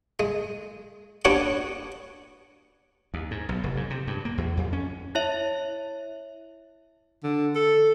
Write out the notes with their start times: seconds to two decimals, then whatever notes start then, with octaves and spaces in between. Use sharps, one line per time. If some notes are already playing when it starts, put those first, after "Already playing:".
0.20 G#3
1.25 B3 C#4 D4 F#4 G4 C#5
3.14 D#2
3.31 G#2
3.49 B1
3.64 F1
3.77 G#2
3.90 C3
4.07 G2
4.25 A#3
4.38 E2
4.57 F2
4.73 C#4
5.15 E4 C#5 E5
7.24 D3
7.55 A4